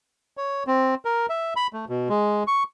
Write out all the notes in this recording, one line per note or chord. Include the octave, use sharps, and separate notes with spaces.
C#5
C4
A#4
E5
B5
A3
B2
G#3
C#6